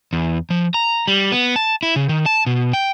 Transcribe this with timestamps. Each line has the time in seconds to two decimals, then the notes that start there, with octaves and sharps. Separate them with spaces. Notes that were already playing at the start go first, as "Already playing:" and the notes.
0.13 E2
0.50 F3
0.74 A#5
1.08 G3
1.32 B3
1.56 A5
1.83 E4
1.96 C#3
2.09 D#3
2.26 A5
2.46 B2
2.73 G5